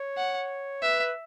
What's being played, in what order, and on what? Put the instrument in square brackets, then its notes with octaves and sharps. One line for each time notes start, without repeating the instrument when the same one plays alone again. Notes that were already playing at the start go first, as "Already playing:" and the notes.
Already playing: [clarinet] C#5
[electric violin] F#5
[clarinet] B4 [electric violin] E5